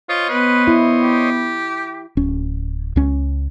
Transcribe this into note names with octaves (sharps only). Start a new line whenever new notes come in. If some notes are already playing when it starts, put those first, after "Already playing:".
F4 C5 C#5 D#5
B3 B4
E4
G4
D1 C#4
C#2 C#4